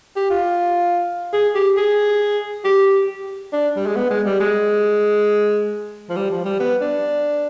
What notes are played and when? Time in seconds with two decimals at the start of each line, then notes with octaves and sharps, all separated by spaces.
0.16 G4
0.30 F4
1.33 G#4
1.54 G4
1.77 G#4
2.64 G4
3.52 D4
3.76 G3
3.86 G#3
3.96 B3
4.10 G#3
4.26 G3
4.40 G#3
6.09 F3
6.16 G3
6.31 F3
6.45 G3
6.59 B3
6.81 D4